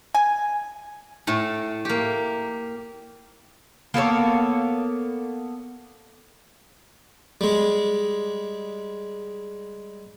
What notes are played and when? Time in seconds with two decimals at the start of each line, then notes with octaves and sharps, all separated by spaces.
0.15 G#5
1.27 A2 A3
1.85 A#3 G4
3.94 A#3 B3 A4 C#5
7.41 G3 G#3